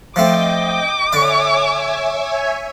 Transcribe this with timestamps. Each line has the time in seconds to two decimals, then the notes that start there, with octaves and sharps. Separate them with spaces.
0.16 F3 A3 C4 D#5 G5 D6
1.13 D3 C#5 D5 E5 G#5